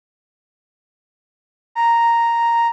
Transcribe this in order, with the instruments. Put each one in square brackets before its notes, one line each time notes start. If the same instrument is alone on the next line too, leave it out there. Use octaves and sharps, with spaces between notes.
[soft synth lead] A#5